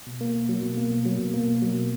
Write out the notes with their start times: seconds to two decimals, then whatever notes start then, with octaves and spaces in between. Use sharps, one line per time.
0.07 B2
0.21 A#3
0.36 B2
0.49 F#3
0.63 B2
0.77 A#3
0.91 B2
1.05 F#3
1.19 B2
1.34 A#3
1.48 B2
1.62 F#3
1.76 B2